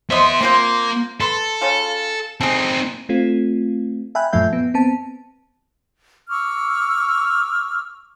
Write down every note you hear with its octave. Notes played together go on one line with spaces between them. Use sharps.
B3 C5 D#5 E5 C6
A#3 C4 F4 C5
A4 B4 C6
C#3 C#4 F4
C4 D#4 G#4 A4
A3 C4 F4
E5 G5 G#5 B5 F#6
F#2 A#2 F3 A3 E5 G6
B3
B3 C4 A5
C#6 D6 E6 F6